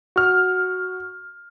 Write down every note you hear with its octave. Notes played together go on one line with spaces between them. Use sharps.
F#4 F6